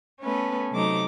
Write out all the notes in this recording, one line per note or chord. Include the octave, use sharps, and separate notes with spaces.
A3 B3 C#4 A4 B4
C3 F#3 A3 D#4 D6